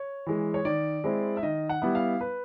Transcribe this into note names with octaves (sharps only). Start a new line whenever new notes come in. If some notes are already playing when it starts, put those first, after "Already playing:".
Already playing: C#5
E3 G#3
C#5
D#3 D5
G#3 C4 E4
E5
D#3 D#5
F#5
G3 B3 E4
F5
B4